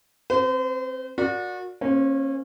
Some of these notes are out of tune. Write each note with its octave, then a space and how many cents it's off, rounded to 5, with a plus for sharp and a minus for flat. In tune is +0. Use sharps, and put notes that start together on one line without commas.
C4 +20 C5 -40
F#4 -30 A#4 +0 D5 +0
A#3 +0 C#4 -30 C5 +0